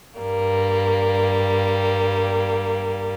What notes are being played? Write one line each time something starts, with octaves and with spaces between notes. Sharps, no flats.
G2 G3 A#3